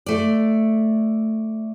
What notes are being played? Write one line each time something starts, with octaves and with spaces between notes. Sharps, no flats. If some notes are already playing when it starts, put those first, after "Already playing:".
A3 D5